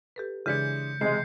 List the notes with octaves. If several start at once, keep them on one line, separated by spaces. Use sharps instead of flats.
G4 A4 B4
C#3 E3 G#3 D4 G6 G#6 B6 C#7
C3 E3 G#3 C7